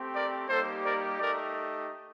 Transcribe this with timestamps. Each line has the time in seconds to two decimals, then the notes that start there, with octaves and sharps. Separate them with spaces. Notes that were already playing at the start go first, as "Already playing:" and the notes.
Already playing: A3 C4 G4
0.13 A#4 D5
0.48 G3 A#3 D#4 G4 A4 C5
0.84 A#4 D5
1.19 A3 D#4 G4 A#4 D5